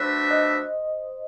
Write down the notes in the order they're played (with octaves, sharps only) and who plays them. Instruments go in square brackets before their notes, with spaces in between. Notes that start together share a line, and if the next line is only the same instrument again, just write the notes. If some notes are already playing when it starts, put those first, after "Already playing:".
Already playing: [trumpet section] A3 D4 F#4 B4 E5 [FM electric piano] C5
[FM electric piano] D#5